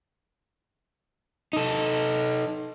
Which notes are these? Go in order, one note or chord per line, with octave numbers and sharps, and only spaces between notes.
D#4 A4